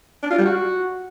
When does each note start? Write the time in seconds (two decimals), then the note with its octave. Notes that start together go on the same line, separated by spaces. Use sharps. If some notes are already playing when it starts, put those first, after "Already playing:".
0.23 D4
0.30 F4
0.38 G3
0.46 F#4